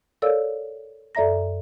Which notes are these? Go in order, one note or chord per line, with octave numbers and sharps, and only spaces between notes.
A4 A#4 C#5 D5 F5 E6
F#2 A4 D5 E5 A#5 A#6